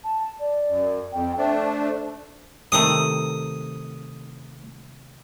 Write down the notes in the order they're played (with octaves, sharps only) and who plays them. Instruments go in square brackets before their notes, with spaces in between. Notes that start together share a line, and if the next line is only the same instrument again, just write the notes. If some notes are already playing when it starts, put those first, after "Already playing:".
[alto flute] A5
D5
[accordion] F#2
[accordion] F2 [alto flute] G5
[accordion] A3 D4 [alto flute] C5
[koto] C3 D#3 A3 [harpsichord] D#6